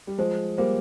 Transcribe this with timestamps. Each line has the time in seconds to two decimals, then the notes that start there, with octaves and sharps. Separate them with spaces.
0.07 G3
0.18 F3 G#3 C5
0.58 G3 A#3 C5